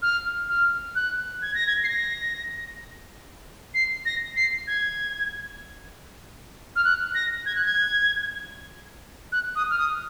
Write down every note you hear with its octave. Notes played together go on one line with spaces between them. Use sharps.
F6
F6
F#6
G#6
A#6
G#6
C7
A#6
C7
A#6
C7
G#6
F6
F#6
A#6
G#6
F#6
G#6
F#6
D#6
F6
D#6